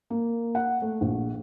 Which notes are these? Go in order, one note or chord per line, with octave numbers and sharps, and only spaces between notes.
A#3
F#5
A3
A#1